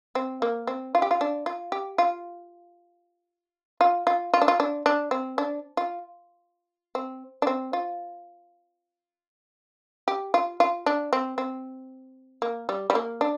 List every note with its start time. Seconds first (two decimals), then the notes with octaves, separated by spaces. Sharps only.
0.15 C4
0.42 A#3
0.67 C4
0.95 F4
1.02 G4
1.11 F4
1.21 D4
1.46 F4
1.72 G4
1.98 F4
3.81 F4
4.07 F4
4.34 F4
4.42 D4
4.48 F4
4.60 D4
4.86 D4
5.11 C4
5.38 D4
5.77 F4
6.95 C4
7.42 D4
7.47 C4
7.73 F4
10.08 G4
10.34 F4
10.60 F4
10.86 D4
11.13 C4
11.38 C4
12.42 A#3
12.69 G3
12.90 G3
12.95 A#3
13.21 D4